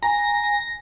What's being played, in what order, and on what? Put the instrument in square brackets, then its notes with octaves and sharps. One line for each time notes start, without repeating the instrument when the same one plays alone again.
[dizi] G#5 [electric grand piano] A#5 [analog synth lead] A#6